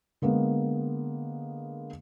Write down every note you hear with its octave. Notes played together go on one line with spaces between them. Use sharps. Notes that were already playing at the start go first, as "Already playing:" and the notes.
D3 G#3 A#3 B3